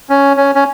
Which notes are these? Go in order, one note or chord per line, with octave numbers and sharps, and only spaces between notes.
C#4
C#4
C#4